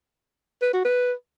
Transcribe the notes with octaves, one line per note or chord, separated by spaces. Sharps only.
B4
F#4
B4